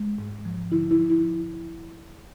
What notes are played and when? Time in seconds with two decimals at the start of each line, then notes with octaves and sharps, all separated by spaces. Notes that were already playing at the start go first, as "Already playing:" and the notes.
Already playing: G#3
0.18 G#2
0.45 F3
0.71 D3 E4
0.91 E4
0.98 F3
1.10 E4